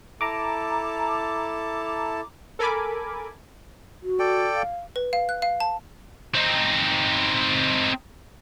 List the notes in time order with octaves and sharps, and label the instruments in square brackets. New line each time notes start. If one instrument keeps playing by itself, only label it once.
[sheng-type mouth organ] E4 A4 A5 [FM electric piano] A#5 D6
[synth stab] A4 A#4 G#5 B5 D6
[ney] F#4
[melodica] A4 D5 G5
[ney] F5
[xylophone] B4
F5
F#6
F5
A5
[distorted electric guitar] C4 D#4